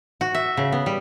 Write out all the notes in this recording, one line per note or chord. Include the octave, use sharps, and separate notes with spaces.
F#4
E5
C#3
B3
G3